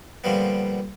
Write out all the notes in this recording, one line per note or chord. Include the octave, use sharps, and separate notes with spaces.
A#2 D3 F3 G3 B3